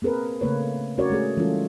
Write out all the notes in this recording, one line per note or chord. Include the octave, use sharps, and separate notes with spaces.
A#3 C4 G#4 A#4 B4
C#3 A3 A#3 B4 C#5
C#4 F#4 A#4 C#5 D5
G#3 A3 G#4
E3 G3 G#3 C#4 F4 A4